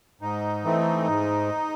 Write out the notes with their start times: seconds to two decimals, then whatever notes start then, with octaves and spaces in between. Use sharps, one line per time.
0.21 G#2 D#4
0.64 E3 A3 C4
1.07 G#2